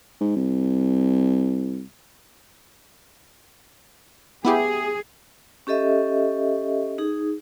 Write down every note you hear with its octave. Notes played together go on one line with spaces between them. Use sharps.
G#2
C2
B3 E4 G4 G#4
C#4 G4 A4 D#5 E5
D#4 G#4